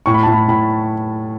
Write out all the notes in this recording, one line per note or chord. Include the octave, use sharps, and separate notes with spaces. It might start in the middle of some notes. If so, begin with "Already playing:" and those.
A2 C#6
B5
A2 A5
B5
A2 B5